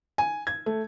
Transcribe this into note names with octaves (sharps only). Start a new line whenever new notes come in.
G#5
G#6
A3